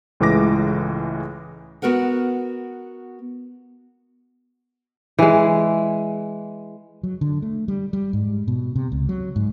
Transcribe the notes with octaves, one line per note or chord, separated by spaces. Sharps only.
C#2 A2 E3 G#3 D6 A#6
B3 F#4 A#4 B4 F#5
E3 G#3
F#3
D3
A3
G3
G3
G#2
B2
C3
C#2
F#3
G#2